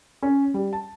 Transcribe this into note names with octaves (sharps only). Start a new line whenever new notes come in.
C#4
G3
A5